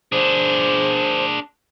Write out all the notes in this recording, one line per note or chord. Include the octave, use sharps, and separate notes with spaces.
D4 G#4 C5